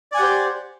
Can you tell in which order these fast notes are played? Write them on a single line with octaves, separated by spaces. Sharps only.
D5 G#5 F#5 G4 C5